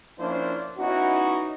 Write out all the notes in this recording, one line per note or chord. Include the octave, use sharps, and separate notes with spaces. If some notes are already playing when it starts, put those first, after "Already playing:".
F3 A#3 C#4 D4 E4 C5
B3 C#4 D#4 E4 F#4